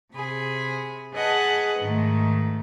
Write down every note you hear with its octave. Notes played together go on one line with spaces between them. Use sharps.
C3 G#4 B5
G#4 B4 D#5 F#5 A5
G#2 D#3 A3